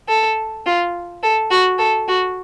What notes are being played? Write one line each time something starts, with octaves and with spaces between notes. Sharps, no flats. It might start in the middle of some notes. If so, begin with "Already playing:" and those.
A4
F4
A4
F#4
A4
F#4